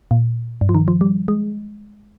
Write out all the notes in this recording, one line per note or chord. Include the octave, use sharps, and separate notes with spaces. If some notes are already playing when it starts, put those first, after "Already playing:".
A#2
G2
F3
D#3
F3
G3
G#3